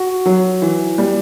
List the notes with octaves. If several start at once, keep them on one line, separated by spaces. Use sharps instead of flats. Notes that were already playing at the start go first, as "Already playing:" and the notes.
Already playing: F#4
F#3
E3
G3